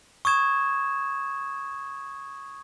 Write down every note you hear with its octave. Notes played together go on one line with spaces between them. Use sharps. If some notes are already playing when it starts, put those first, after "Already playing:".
C#6 D#6 G#6 E7